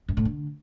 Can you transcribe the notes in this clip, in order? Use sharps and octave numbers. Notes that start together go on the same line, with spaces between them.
F#2
A2
D3